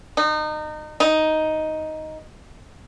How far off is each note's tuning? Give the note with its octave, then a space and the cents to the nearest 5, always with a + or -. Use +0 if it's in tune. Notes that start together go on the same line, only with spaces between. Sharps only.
D#4 -30
D#4 +5